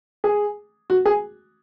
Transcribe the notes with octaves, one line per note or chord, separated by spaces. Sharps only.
G#4
F#4
G#4